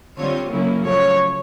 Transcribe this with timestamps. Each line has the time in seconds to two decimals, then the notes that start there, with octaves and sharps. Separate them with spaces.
0.17 D3 G3 C4 F4 C#5
0.51 C#3 F#3 A#3 C#4 E4
0.84 F#2 C#3 F3 A3 C#5